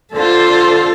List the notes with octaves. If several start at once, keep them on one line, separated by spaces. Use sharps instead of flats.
D3 F4 A4 C5